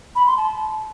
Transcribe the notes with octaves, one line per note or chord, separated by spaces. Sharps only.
B5
C6
A5